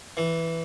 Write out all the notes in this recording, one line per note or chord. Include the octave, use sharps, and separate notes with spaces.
E3